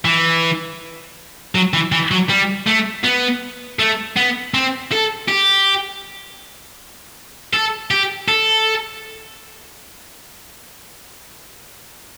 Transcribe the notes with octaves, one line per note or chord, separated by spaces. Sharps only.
E3
F#3
E3
E3
F#3
G3
A3
B3
A3
B3
C4
A4
G4
A4
G4
A4